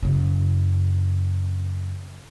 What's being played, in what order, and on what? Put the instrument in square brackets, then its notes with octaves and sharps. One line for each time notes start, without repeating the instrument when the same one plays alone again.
[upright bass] F#2 C#3